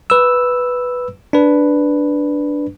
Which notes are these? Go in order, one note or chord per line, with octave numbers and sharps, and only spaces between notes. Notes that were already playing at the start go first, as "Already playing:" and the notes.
B4 E6
D4 B4